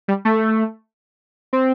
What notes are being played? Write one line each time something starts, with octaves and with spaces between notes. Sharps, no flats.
G3
A3
C4